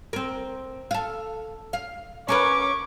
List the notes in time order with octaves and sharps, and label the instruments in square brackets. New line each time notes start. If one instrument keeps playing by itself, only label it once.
[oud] C4 A#4
A4 F5
F5
[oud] C#4 A#4 B4 [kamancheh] C#6 D6